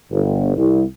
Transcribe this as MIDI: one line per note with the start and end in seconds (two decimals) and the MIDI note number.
0.11 0.52 31
0.56 0.82 36